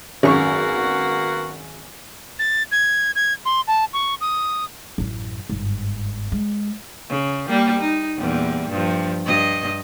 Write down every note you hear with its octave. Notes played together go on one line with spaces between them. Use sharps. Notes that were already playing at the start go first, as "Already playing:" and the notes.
G#1 F#2 A#3 B3 F#4 C#6
A6
G#6
G#6
C6
A5
C#6
D#6
A1 F#2
G1 G#2
G#3
C#3
G3 A#3
D#4
E2 A#2 G3
G2 F3
G2 D#5